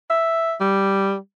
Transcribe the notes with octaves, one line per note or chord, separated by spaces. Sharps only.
E5
G3